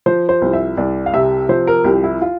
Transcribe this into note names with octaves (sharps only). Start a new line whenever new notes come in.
F3 C5
C5
C2
E5
C2 D5
F5
C3 E5
F3 C5
A#4
C2 G4
E4
F4